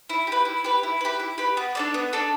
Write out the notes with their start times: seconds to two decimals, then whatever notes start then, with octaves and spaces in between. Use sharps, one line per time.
0.09 E4
0.27 G4 B4
0.45 E4
0.64 G4 B4
0.83 E4
1.01 G4 B4
1.20 E4
1.38 G4 B4
1.57 B3
1.75 D4 A4 D5
1.94 B3
2.13 D4 A4 D5